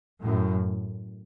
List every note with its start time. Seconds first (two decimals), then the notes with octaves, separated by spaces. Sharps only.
0.23 F#2 A2